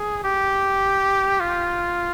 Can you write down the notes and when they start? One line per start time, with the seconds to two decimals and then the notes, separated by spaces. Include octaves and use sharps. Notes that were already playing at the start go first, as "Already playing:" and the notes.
Already playing: G#4
0.24 G4
1.40 F4